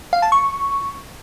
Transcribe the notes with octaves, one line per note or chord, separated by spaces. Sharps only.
F5
A5
C#6